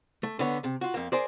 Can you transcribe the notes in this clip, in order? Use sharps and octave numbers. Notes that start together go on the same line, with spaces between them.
A3
D3 B3 C#5
C3
F4 F#4
F2 A#3
G#4 A#4 C5 D5